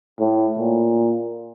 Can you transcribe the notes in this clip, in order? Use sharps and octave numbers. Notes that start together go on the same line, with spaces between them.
A2
A#2